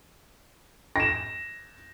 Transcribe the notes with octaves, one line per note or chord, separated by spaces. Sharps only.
A#6 E7